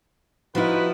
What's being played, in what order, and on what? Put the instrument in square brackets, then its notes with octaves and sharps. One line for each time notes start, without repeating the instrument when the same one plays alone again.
[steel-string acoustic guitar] F3 E4 [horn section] D#4 F#4 B4